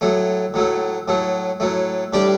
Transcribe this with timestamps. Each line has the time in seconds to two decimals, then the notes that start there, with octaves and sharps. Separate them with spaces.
0.01 A2 F#3 A3
0.54 A2 F#3 A3
1.08 A2 F#3 A3
1.60 A2 F#3 A3
2.13 A2 G3 D4 G4 D5